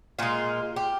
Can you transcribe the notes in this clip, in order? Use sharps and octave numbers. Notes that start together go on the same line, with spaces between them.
A#2 G#3 F4
G4